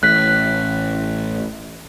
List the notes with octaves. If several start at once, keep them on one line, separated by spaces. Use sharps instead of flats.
A1 A2 F#6 B6